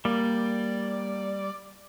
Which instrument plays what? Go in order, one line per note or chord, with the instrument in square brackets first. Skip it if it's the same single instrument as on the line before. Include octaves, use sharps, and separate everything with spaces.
[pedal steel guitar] G3 [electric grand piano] A#3 [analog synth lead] D5